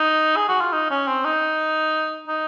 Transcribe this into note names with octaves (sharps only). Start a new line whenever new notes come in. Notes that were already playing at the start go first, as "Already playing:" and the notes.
Already playing: D#4
G#4
F#4
F4
D#4
C#4
C4
D#4
D#4